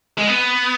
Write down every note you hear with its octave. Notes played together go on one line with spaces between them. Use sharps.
G#3
B3